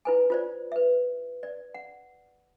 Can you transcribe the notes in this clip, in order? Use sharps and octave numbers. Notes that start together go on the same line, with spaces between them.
E4 B4 G#5
F4 C5 D5
B4 E5
D5
F#5